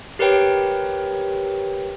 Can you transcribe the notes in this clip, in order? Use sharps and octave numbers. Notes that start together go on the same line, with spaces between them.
G4 A#4 B4 C#5 G5